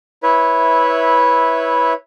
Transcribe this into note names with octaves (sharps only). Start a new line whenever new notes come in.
E4 B4 C#5 E5